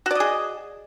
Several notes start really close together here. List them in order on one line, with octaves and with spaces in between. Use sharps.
F#4 D5 D#5 G#4